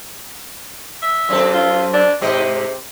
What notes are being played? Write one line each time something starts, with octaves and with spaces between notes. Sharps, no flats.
E5
F#2 C4 A4
F4
D4
G#2 C3 G4 D#5